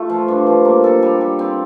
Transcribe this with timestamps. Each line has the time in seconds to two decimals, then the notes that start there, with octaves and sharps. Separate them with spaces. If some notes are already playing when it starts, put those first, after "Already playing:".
Already playing: A3 F4 A4
0.09 F3
0.28 G2
0.46 F3
0.65 A#3
0.84 A4
1.02 G3
1.21 G3
1.39 C4